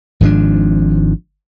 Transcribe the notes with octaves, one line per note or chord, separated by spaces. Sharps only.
G#1 G#2 F3 D4